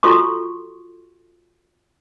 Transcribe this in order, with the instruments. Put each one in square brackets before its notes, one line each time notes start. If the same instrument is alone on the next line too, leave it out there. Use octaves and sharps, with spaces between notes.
[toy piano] F4 F#4 A4 C6 C#6